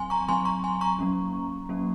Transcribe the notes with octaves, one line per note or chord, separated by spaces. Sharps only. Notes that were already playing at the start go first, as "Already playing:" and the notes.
Already playing: F#3 C4 G#5 C6
A#5 C#6
F#3 C4 G#5 C6
A#5 C#6
G#5 C6
A#5 C#6
F#3 A#3 C#4
F#3 A#3 C#4